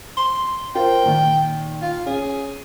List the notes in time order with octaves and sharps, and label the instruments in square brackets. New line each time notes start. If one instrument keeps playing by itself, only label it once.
[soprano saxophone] C6
[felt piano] F4 A#4 C5 [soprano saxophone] G5
[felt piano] A#2 D#3 D#4
[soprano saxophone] F4
[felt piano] C#4 [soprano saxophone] G#4